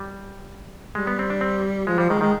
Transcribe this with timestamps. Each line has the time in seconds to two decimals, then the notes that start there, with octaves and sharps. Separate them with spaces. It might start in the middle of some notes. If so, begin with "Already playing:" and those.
Already playing: G3
0.95 G3 G#3
1.07 B3
1.19 C4
1.30 D4
1.41 C4
1.87 F3 G#3
1.98 F3 G3
2.09 D#3 G#3
2.21 D#3 G#3